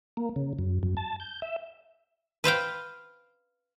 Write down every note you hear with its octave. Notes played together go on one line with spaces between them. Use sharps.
A#3
C#3
F#2
F#2
A5
G6
E5
B4 C5 F5 G5